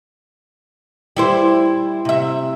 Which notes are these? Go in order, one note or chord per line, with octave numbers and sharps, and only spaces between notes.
G3 E4 C5
C3 E5